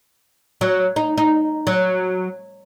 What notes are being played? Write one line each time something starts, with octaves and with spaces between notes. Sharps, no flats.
F#3
D#4
D#4
F#3